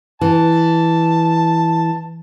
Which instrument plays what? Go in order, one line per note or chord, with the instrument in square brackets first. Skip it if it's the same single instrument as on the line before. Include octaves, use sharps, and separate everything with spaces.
[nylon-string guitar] E3 [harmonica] A5